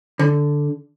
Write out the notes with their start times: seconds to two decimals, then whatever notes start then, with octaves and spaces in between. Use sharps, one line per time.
0.19 D3